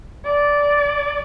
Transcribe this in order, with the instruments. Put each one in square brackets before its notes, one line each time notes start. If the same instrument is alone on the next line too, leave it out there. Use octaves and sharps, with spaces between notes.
[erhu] D5